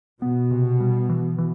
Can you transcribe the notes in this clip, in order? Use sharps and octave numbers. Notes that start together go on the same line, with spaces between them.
B2 B3
C3
G3
E3
E3